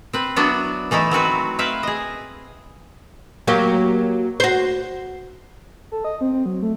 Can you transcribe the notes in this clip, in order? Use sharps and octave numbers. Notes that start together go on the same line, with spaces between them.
C4 B4
F#3 B3 D4 E4 F#4
E3 A3 D#4 E4
F#3 C4 F#4 B4
C4 E4 B4 E5 F5
G#4 D#5
F#3 A#3 G4
F#4 C5
A4
D#5
C4
C4
F#3
A3